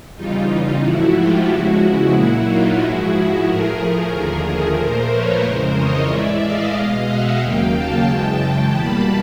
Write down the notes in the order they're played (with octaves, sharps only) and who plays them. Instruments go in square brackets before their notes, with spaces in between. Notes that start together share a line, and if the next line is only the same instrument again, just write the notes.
[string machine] E2 C#3 E3 G3 D#4 F4
G#2 F3 A3 E4 F#4
F4 G4
E2 C#3 F3 G#3 E4 F#4
A#2 F#3 A#3
D#4 F4
G#2 F3 G#3 E4 F#4
A2 F3 A3 G#4 A#4
D#2 D3 F3 A3
G#4 A#4
A#2 F3 A3 A#4 C5
B4 C#5
F2 C#3 E3 G#3 A#4 C5
C#5 D#5
A2 E3 G#3 D5 E5
D#5 F5
B2 G#3
E5 F#5
D#2 C#3 F#3 A#3 F5 G5
G5 A5
F#2 C#3 E3 G#3
E2 B2 G3 A#3 A5 B5